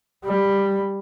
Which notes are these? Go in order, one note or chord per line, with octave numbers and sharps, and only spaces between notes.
G3